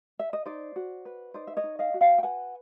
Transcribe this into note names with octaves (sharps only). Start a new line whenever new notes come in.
E5
D#5
D#4 C5 D5
F#4
B4
D#4 C5 D5
E5
C#5 D#5
D#4
D#5 F5
F#4
F5 G5
G5
B4 F#5 G#5